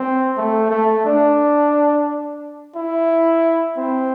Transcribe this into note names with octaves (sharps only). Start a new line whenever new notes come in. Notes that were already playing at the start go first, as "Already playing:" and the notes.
Already playing: C4
A3
A3
D4
E4
C4